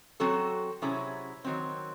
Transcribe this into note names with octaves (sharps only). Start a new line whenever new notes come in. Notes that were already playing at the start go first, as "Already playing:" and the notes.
F#3 C4 F#4 A4
C3 F#3 C#4 E4 G#4
D#3 F#3 C4